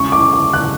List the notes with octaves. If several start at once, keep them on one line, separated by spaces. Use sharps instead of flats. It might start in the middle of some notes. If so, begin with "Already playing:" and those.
Already playing: C#3 G#3 C#6
D6
D6
F#6